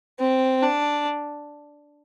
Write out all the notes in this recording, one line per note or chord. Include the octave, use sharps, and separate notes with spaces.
C4
D4